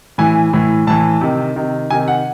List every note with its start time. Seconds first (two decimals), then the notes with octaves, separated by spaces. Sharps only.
0.18 A2 E3 G#5
0.53 A2 E3
0.87 A2 E3 A5
1.21 C3 D#3
1.56 C3 D#3
1.90 C3 D#3 G#5
2.08 F#5